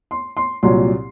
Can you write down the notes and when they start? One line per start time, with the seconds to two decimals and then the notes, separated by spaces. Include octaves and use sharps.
0.11 C6
0.37 C6
0.63 C2 A#2 F#3 C6